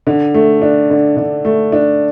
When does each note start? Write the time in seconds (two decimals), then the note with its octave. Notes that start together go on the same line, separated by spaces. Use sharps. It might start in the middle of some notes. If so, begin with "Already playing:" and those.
0.07 D3
0.34 A3
0.62 D4
0.90 D3
1.17 D3
1.45 A3
1.72 D4